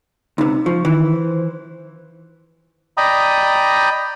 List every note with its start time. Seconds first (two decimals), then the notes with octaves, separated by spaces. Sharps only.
0.38 C#2 C3 D#4
0.66 F3 C#6
0.85 D#3 E3
1.13 C5
2.97 D5 D#5 G5 A#5 B5 D#6